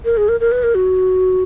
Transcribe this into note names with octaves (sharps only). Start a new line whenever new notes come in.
A#4
G#4
A#4
A#4
B4
A#4
F#4